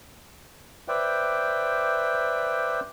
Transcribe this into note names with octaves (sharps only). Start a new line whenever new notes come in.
B4 C5 D5 E5 G5